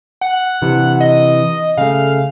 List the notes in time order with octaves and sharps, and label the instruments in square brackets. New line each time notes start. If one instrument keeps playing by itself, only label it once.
[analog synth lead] F#5
[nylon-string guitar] C3 E3 D4
[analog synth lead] D#5
[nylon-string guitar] C#3 A3 [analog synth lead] F5